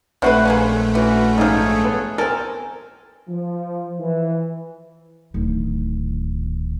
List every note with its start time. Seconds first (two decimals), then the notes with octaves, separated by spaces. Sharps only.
0.22 A#1 C3 A3 C4 F#4 B4 C5 F#5
0.45 G#3 A#3 C#4
0.95 E3 C#4 F#4
1.38 G#2 F3 C#4 D#4 G#4 A4 C#5
1.84 B3
2.18 C4 A4 A#4 G#5
3.29 F3
4.00 E3
5.34 D1 D#3